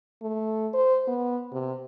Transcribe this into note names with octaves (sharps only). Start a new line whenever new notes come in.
A3
C5
B3
C3